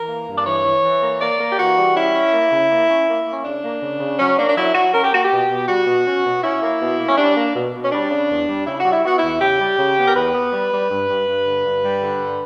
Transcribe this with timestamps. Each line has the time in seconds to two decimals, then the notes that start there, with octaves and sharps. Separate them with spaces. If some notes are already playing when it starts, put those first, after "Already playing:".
Already playing: E3 A#4
0.09 A#3
0.28 G2
0.38 D5
0.46 E3 C#5
0.65 E3
0.84 E3
1.02 A#3
1.21 A#3 D5
1.39 A#3
1.51 G4
1.58 E3 F#4
1.77 G3
1.95 C#4 E4
2.14 C#4
2.33 A#3
2.51 C#3
2.71 A#3
2.89 C#4
3.07 A#3
3.25 A#3
3.31 C#4
3.44 C#3 D4
3.63 A#3
3.82 C#3
4.00 C#3
4.19 F#3 C#4
4.38 A#3 D4
4.49 D4
4.56 F#3 E4
4.74 F#3 F#4
4.93 C#4 A#4
5.04 G4
5.12 A#3 F#4
5.25 G4
5.31 B2
5.50 B2
5.68 G3 F#4
5.87 B2
6.06 C#4
6.24 B2
6.43 C#4 E4
6.62 A#3
6.80 B2
6.99 A#3
7.08 C#4
7.17 G3 D4
7.35 A#3
7.55 B2
7.73 B2
7.85 C#4
7.92 G3 D4
8.11 C#3
8.29 E2
8.48 G3
8.66 C#3 E4
8.80 F#4
8.85 G3
8.92 E4
9.04 B3 F#4
9.18 E2 E4
9.41 C#3 G4
9.59 G3
9.78 C#3
9.97 B3
10.07 A#4
10.15 E2 B4
10.34 B3
10.53 G3
10.72 G3
10.90 G2
11.09 G2
11.27 G2
11.46 D3
11.64 G2
11.83 G3
12.02 D3
12.20 G2